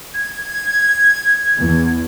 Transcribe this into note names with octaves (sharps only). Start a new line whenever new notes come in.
G#6
E2